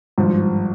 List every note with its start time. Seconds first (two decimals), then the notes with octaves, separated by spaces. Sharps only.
0.18 G#1 G2 F3